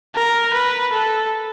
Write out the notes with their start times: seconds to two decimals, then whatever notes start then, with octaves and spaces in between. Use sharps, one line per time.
0.14 A#4
0.53 B4
0.92 A4